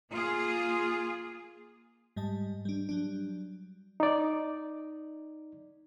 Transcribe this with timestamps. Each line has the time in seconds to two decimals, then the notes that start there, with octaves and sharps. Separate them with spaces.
0.13 A#3 F4 G#4
2.16 G#2 G3 D#5 A5
2.65 G3 D4
2.89 F#3 G3 D4
4.00 D#4 D5